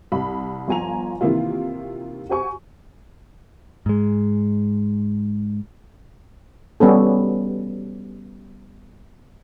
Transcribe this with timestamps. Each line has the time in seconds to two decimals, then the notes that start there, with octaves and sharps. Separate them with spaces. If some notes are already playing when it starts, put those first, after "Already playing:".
0.12 C2 B5
0.68 G1 F3 F4 G#5 A#5 F7
1.21 C3 D#3 E3 A#3 E4 F4
2.29 F#4 G4 C5 G#5 C#6
3.86 G#2 G#3
6.80 G3 B3 C#4 A4